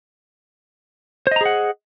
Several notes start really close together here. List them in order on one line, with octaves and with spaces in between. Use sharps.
C5 D#5 A#5 G#4 F#5